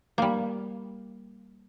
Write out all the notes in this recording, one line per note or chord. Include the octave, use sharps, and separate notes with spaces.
G3 A#3